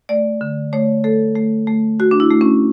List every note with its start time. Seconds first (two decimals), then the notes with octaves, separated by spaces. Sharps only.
0.09 A3 D5
0.41 D3
0.73 A3 C#5
1.04 A3 A4
1.35 A3
1.67 A3
1.99 A3 F#4
2.11 D4
2.20 E4
2.31 A3
2.41 C#4